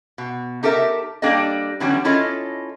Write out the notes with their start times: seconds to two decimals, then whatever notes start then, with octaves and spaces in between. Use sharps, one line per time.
0.18 B2
0.63 D#4 G4 A4 A#4 E5
1.22 G3 A#3 D4 G4 A4 D#5
1.80 D3 E3 F#3 G3 B3 C#4
2.05 C#4 E4 F4 A4 C#5 D#5